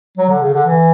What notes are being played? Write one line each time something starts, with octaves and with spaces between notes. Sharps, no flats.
F#3
D3
C#3
D3
E3